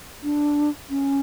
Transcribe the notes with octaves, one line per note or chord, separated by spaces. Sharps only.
D4
C#4